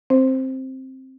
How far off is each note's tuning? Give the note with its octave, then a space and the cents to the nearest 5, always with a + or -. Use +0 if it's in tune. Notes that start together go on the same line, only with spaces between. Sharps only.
C4 +10 C5 +0